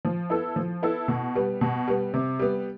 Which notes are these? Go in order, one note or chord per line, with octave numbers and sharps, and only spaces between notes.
F3
B3 E4 A4
F3
B3 E4 A4
B2
G3 B3
B2
G3 B3
C3
G3 B3